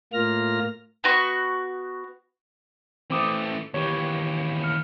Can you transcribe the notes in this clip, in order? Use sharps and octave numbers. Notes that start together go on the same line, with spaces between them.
A2 A#3 F4 F6 A#6
B3 F#4 C#6
E3 A3 C4 D6 D#6
D#2 E3 G4 C#5
F6 C#7